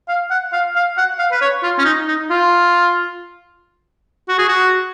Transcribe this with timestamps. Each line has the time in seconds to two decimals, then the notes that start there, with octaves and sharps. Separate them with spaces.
0.08 F5
0.31 F#5
0.53 F5
0.75 F5
0.98 F#5
1.19 F5
1.32 B4
1.41 C#5
1.63 F4
1.78 C#4
1.85 D#4
2.08 D#4
2.30 F4
4.29 F#4
4.38 G#4
4.49 F#4